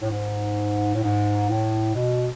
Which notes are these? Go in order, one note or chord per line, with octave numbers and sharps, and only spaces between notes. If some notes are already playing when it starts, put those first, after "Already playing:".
A2
G#2
A2
G#2
A2
B2